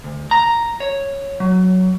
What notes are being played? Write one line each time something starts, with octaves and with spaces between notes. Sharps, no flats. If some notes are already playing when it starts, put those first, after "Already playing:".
D2
A#5
C#5
F#3